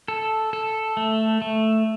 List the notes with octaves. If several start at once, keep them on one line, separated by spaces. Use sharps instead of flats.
A4
A4
A3
A3